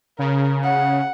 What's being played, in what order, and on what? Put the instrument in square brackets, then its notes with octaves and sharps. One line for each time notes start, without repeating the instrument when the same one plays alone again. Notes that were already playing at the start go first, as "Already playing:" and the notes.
[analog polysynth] C#3 [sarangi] A#4
[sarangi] F#5